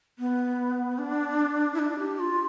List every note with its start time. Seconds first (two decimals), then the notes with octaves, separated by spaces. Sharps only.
0.19 B3
0.98 D4
1.74 E4
1.79 D4
1.99 G4
2.19 F4